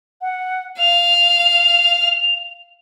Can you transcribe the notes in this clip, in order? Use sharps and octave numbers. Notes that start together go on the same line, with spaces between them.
F#5
F5 F7